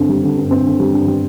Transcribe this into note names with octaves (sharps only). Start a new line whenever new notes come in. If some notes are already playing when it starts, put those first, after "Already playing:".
Already playing: G2 D3 C4
G3
D3
G2
C4
D3
G3
G2
G3